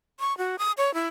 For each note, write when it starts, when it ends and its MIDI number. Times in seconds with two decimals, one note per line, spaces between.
0.20 0.36 85
0.38 0.56 66
0.59 0.72 87
0.78 0.94 73
0.94 1.08 64